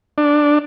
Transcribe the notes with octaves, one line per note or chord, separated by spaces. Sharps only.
D4